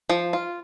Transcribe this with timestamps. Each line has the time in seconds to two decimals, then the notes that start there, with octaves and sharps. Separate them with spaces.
0.09 F3
0.33 F4